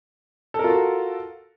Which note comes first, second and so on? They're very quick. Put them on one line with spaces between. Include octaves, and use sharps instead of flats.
A4 A#4 F4 F#4